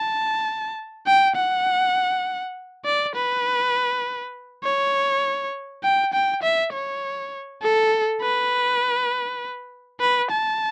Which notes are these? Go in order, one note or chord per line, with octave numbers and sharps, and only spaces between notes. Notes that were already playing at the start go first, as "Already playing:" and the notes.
Already playing: A5
G5
F#5
D5
B4
C#5
G5
G5
E5
C#5
A4
B4
B4
A5